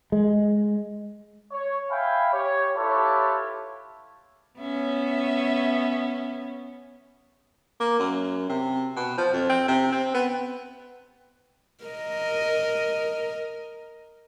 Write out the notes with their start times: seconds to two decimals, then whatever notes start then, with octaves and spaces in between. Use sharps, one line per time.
0.12 G#3
1.52 C#5
1.91 E5 F5 G5 G#5 B5
2.33 G4 C#5
2.76 E4 F4 G4 A4 B4 C#5
4.60 B3 C#4 E5
7.80 A#3
7.99 F#2
8.49 C3
8.96 B2
9.18 F3
9.33 F2
9.49 C4
9.68 C3
9.92 C4
10.14 B3
11.84 A#4 D#5